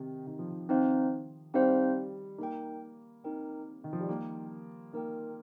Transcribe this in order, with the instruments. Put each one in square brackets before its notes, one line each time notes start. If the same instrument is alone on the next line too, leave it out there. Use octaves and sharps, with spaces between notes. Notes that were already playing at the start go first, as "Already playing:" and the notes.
Already playing: [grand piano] C3 D#3
D#3
F3
D#3
[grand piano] D#3 [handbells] C4 D#4 C5 F5
[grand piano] G3 [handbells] C4 D#4 C5 F5
[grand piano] A#3 [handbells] D#4 A#4 G5
[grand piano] C4 [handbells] D#4 A#4 G5
[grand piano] D#3
F3
G3
[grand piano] A#3 [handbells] D#4 A#4 G5
[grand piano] A#3 [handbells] D#4 A#4 G5